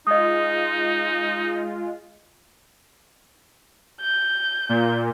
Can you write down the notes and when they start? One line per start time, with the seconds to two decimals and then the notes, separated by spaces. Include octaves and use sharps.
0.07 G#3 D#4 F4 D#5 D#6
4.01 G6
4.69 A#2